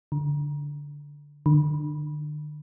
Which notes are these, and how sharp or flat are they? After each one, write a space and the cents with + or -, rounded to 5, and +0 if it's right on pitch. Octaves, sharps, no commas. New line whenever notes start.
D3 -10
D3 +35